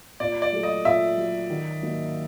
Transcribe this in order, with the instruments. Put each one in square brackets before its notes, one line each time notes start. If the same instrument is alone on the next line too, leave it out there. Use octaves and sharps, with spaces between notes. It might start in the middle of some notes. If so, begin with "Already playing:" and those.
[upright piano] A#2 [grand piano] D5
[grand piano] D5
[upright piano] F#3 A3
[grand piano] D#5
[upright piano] A#2 [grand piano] E5
[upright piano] F#3 A3
D#3
F#3 A#3 D#4